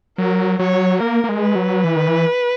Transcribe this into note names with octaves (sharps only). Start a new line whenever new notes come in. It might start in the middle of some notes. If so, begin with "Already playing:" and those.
F#3 A#4
F#3 C#5
A#3 A#4
A#3
G#3
B4
F#3
E3
D#3
E3